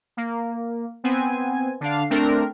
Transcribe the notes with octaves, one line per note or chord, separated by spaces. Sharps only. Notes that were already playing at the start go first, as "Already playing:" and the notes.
A#3
B3 C4 G#5
D3 D4 F5
A3 C4 D4 A#4